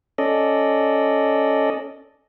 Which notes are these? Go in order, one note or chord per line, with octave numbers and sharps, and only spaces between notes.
C#4 A4 D5 D#5